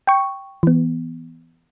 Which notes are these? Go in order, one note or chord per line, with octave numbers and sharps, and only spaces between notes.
G5 C#6
E3 B3